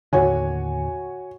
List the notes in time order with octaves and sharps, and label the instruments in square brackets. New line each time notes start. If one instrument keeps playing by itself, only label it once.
[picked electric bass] D#2 A2 D3 [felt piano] F#4 C#5 G#5